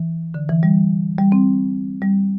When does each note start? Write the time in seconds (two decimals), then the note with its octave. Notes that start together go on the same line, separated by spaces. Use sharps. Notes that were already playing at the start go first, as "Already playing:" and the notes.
Already playing: E3
0.34 D3
0.49 E3
0.63 G3
1.18 G3
1.32 C4
2.02 G3